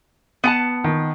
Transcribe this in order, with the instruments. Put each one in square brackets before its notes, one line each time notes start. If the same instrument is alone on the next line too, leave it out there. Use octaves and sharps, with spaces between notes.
[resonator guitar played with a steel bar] B3 F#5 A5
[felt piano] D#3